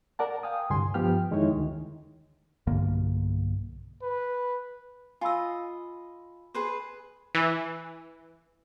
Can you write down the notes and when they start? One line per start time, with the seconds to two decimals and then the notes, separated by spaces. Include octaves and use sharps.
0.19 A#4 D5 F#5 A5
0.43 F5 G5 G#5 D#6
0.70 C2 G2 D3 G#5 C6
0.94 G2 F3 B3 G4 G5 F6
1.31 F2 D#3 G#3 D#4 E4 C#5
1.52 D2 D#3
2.67 B1 G2 D3 A#3
4.02 B4
5.21 F4 D#5 G#5 B5 E6
6.54 G#4 B4 C5
7.35 E3